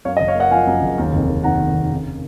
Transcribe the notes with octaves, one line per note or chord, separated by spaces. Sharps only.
F#2 C#5 F5
D#5
F#1
C#5 F5
A#3 D#5 F#5
F3 F5 G#5
F#2
F#1
D#2
F1
F1
D#3 F#5 A#5
D#2
F1
C#3